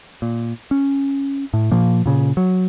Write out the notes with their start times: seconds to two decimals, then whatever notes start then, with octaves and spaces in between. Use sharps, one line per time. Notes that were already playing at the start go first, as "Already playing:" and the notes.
0.22 A#2
0.71 C#4
1.54 A2
1.71 A#2 F3 A#3
2.06 A#2 C#3
2.37 F#3